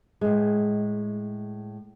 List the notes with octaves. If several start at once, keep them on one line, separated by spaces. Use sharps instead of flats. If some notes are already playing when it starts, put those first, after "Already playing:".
A2 G#3